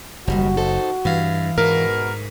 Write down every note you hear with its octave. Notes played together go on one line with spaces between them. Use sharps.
F#1 D#2 G3 G#3 F#4
D#4 A4 C5
G2 E3 F5
G#2 B2 A#4